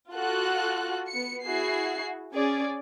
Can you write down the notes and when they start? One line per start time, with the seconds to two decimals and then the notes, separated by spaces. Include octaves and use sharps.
0.13 F4 F#4 A4 F#6
1.09 B3 C#7
1.44 E4 F#4 G#4 C7
2.32 C#4 G#4 D5